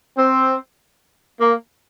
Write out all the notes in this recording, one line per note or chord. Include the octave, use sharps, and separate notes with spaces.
C4
A#3